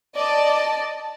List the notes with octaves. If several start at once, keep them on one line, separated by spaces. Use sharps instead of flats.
D5 D#5 A5